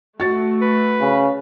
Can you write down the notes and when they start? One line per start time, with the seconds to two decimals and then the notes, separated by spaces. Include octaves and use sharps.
0.20 A3 F#4 A6
0.62 B4
1.01 C#3